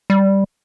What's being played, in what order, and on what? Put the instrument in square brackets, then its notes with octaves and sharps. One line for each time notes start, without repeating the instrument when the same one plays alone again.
[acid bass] G3